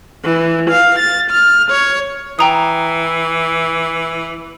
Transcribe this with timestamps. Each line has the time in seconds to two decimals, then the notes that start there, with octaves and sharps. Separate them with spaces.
0.24 E3
0.68 F5
0.98 A6
1.29 F6
1.69 C#5
2.39 E3 G5 A#5 D#6